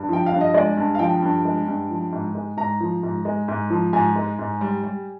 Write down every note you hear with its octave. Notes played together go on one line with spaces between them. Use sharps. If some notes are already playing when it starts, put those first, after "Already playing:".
Already playing: G2
F3 G5
F5
G2
D#5
G#3 D5
G2
F5
F3 G5
G2
G#3
G2
F3
G#2
G#3
G#2 A#5
F3
G#2
G#3
G#2
F3
G#2 G#5
G#3
G#2
G3
G3